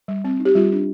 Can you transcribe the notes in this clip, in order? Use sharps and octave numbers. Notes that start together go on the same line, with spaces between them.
G3
C4
D#4
G4
G3 F4
D4